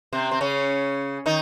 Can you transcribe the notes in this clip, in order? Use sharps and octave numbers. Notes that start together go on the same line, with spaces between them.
C3 C4
C4
C#3 C#4
D#3 D#4